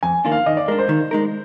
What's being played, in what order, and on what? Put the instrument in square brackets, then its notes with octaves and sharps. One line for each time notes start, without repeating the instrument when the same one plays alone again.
[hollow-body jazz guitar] F2 [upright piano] G#5
[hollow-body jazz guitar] D#3 A#3 D4 F4
[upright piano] F5
[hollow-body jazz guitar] D#3 [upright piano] D#5
[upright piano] D5
[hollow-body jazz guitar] G#3 D4 [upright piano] A#4
[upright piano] C5
[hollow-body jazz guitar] D#3
G#3 D#4 A#4